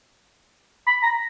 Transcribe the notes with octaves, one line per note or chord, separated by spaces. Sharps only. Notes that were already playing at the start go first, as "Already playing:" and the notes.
B5
A#5